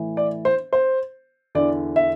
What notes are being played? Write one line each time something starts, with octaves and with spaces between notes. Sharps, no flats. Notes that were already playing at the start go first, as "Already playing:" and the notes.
Already playing: A2 E3
D5
C5
C5
E2 D3 D5
E5